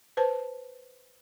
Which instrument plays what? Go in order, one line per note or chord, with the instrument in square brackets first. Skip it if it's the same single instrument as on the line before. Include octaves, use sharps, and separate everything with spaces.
[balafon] B4 C5 A5